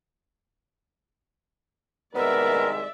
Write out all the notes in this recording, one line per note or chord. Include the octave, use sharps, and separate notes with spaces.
C2 D#3 G#3 B3 A#4 D5 E5